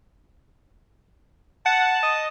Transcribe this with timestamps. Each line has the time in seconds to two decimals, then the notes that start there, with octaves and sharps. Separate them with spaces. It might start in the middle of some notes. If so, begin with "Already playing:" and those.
1.66 F#5 A5
2.03 D#5